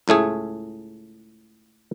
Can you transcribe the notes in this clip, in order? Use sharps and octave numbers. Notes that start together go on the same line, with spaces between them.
C#2 A2 A3 G#4